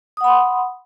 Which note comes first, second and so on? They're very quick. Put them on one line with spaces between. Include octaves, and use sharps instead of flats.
D#6 F#5 B5 C6